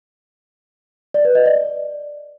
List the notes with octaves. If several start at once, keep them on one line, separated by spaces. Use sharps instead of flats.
D5
B4
D#5
D5